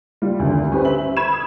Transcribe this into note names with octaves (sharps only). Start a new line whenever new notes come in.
G3 F4
G#1 D2
C#4 G4 B4 C5
E5 F#7
B5 G#6 E7
D#6